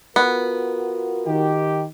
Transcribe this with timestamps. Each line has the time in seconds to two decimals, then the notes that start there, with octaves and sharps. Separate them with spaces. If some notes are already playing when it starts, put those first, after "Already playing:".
0.16 B3 F4 F#4 A#4
1.26 D#3 G4